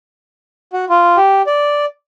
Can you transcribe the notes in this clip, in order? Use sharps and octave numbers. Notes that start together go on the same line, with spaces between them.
F#4
F4
G4
D5